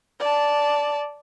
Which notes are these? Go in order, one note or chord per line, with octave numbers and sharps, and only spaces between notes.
D5 A5